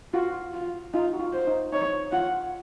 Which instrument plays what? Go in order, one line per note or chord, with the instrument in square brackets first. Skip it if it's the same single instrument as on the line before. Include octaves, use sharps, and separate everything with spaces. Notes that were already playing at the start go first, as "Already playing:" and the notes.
[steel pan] F4 [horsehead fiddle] F#4
[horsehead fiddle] F4
[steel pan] D#4 [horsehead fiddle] F4
[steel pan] F#4
F4
[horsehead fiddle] C5
[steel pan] D#4
[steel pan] D#4 [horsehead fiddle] C#5
[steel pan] F4 [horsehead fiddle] F#5